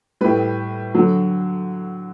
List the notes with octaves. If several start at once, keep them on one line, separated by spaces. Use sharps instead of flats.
A2 G3 B4
D3 F#3